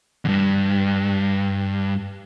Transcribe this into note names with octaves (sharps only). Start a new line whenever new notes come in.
E2 G2